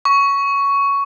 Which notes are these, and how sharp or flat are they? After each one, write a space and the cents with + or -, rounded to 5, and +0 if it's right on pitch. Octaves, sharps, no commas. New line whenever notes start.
C#6 +10